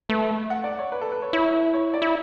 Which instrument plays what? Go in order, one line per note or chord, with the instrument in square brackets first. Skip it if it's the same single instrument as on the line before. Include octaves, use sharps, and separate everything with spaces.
[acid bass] A3 [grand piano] B4
[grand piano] F#5
D5
C#5
B4
A4
B4
C#5
[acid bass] E4 [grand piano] C#5
[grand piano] C#5
D5
[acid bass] E4